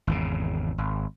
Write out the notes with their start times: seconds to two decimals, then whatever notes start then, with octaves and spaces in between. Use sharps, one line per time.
0.07 G#1 E2 C#3
0.78 G#1